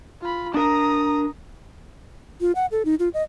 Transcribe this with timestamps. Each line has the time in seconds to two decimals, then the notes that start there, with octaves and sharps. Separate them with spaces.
0.21 F4 B5
0.54 D4 A#4 A#5 D#6
2.41 F4
2.55 F#5
2.72 A4
2.85 D#4
2.99 F4
3.14 D#5